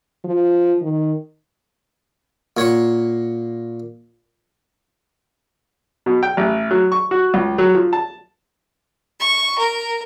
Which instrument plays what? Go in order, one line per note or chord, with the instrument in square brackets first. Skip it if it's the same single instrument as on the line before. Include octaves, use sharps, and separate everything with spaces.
[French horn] F3
D#3
[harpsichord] A#2 C#5 F#5 C#6
[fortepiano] B2
G5
A1
F#3
C#6
F#4
C#2
F#3
F3
A5
[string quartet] C#6
A#4